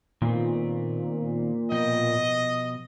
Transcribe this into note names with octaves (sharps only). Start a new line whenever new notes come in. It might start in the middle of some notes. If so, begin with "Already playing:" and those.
A#2 D#3 B3 C4
B2 F3 D#5 G5